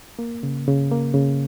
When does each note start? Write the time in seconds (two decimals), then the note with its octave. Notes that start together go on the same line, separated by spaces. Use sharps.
0.19 A#3
0.43 C#3
0.67 C#3
0.91 A#3
1.14 C#3